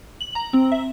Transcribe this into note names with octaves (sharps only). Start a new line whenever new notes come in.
F#7
A#5
C4
E5